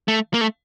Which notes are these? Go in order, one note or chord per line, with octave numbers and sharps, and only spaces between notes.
A3
A#3
A3